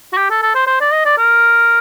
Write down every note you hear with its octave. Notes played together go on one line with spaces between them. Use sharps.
F#4
G4
A4
A4
C5
C5
D5
D#5
D5
A#4